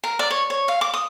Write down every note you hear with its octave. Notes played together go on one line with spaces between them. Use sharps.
A#4
D5
C#5
C#5
F5
D6
D#6